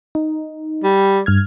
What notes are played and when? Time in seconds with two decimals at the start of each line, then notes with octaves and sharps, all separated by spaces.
0.15 D#4
0.84 G3
1.26 G2 F6 G#6